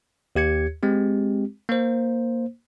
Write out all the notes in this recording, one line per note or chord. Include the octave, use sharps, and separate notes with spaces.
D#2 G4 G#6 C#7
G#3 C4 G4
A#3 C5